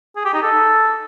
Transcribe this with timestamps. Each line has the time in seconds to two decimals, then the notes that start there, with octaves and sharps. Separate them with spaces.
0.16 G#4
0.25 G4
0.34 D#4
0.42 A4